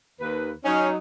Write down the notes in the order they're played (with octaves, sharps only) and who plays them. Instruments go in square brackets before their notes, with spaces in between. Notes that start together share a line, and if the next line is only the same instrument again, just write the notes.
[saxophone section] D#2 B4
[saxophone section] F#3 D#4 [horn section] C#4